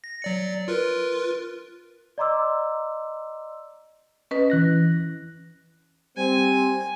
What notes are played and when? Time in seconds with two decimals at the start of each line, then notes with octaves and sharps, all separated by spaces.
0.04 A#6
0.22 F#3 D5 C#7
0.68 F4 A#4 B4
2.18 D5 D#5 A#5 C6 D6 E6
4.31 C#4 B4 D#5
4.50 E3 F#6 A#6
6.17 G3 C4 G#5